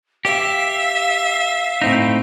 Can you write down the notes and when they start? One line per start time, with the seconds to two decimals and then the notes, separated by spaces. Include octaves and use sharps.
0.25 G4 E5 F5
1.82 A2 C4 D#4